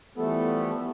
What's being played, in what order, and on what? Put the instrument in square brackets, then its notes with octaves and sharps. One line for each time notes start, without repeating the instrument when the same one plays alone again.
[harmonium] E3 A3 A4 [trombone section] F3 G3 B3